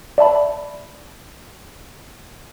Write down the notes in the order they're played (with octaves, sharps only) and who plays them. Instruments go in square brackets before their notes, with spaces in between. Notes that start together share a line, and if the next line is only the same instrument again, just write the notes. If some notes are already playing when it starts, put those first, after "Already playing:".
[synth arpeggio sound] D5 E5 A5 B5